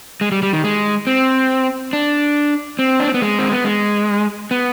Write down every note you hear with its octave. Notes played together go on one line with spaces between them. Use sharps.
G#3
G3
G3
D#3
G#3
C4
D4
C4
D4
C4
B3
G#3
C4
B3
G#3
B3